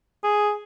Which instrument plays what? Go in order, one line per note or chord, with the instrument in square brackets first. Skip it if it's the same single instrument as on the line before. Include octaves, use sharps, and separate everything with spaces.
[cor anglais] G#4